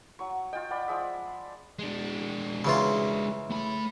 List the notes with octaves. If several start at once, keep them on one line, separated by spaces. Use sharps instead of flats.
F#3 C#6
F4 D#5 G5
D5 F#5 G5 B5
F3 G#3 E5
G#3 D4
C#3 E3 F4
A3 B5